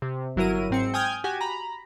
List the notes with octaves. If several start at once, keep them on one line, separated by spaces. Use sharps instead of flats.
C3
G1 F#3 E4 A#4 D#7
G#2 C4 C#7
G5 G#5 D#6 F6 G6 G#6
F#4 G4 G#5
A#5 B5